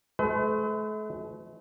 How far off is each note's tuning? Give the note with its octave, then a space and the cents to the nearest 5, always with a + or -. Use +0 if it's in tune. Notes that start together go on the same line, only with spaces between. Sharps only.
A3 -45 B4 +45